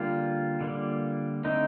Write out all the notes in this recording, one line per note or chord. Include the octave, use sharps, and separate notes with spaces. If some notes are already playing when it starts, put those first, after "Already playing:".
Already playing: D3 G3 A#3 F4
D3 G3 A#3
D3 A3 C4 D#4